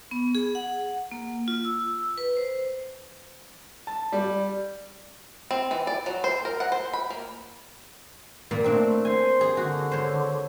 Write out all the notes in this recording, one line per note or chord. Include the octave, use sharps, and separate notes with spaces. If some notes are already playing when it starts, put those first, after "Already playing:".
B3
G#4
F#5
A#3
F4
E6
B4
C5
A5
G3
C4
E3
D5
F#3
C5
A#4
F#5
C5
B5
A#3
A#2 A#3
A3 C4 D4
C5 G#5
G#4
D3 F#4
C5 C#5